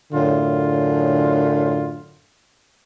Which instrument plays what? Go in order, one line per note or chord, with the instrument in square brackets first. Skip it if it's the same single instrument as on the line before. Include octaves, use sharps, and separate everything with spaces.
[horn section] F#2 A2 D3 F4